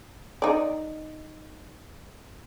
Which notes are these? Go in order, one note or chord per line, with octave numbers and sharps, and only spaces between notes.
D#4 D5